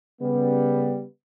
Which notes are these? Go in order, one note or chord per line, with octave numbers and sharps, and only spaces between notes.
C#3 G3 B3